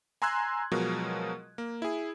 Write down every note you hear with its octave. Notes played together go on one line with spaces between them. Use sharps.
G#5 A#5 C6 E6 F#6 G#6
B2 F3 F#3 G#3 A#4
A#3
E4 G#4